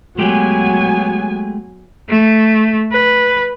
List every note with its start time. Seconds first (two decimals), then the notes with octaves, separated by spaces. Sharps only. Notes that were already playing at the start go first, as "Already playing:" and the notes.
0.19 F#3 G#3 A3 B3 G4 G#5
2.09 A3
2.92 B4